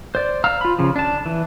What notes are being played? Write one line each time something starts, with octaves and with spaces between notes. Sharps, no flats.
C5 D5
F5 A#5 E6 F6
F4 B5
C#3 F3
D4 A5
E3